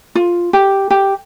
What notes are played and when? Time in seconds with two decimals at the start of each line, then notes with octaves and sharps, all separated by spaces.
0.15 F4
0.53 G4
0.90 G4